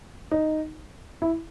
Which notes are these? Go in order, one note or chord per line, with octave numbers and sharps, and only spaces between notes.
D#4
E4